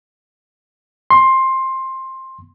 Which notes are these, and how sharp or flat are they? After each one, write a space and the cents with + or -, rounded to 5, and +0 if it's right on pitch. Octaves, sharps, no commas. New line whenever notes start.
C6 +15